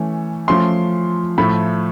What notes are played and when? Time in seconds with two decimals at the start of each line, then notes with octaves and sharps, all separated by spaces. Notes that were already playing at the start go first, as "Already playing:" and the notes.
Already playing: E3 A3 C#4
0.48 F3 A3 C#4 C6
1.38 A2 F3 A3 B5